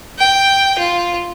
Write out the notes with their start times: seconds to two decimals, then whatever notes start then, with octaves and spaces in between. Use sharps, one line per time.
0.19 G5
0.79 F4